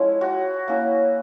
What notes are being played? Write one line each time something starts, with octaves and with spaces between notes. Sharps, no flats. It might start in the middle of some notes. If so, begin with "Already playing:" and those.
Already playing: F3 G#3 C#4 E4
F#4
A#3 C#4 E4